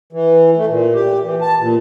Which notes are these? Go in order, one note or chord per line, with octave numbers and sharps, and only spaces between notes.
E3
A3
A#2
G4
E3
A5
A#2